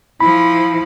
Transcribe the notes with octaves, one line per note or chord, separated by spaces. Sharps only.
F3 E4 B5